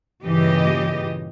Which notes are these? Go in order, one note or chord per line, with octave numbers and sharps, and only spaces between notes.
G2 A#2 C#3 E3 G4 D#5